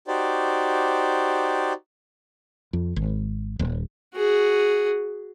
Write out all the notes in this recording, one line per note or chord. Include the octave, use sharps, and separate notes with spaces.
D#4 F#4 G4 C5 D5
F2
G#1
D#1
F#4 G#4